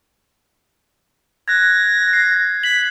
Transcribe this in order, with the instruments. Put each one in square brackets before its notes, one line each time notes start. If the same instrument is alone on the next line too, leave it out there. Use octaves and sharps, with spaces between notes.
[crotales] F#6 G#6 [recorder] A#6
[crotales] C7
[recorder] B6 [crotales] F#7